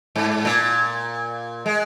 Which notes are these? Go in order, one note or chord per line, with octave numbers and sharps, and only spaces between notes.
G#2
A#2
G#3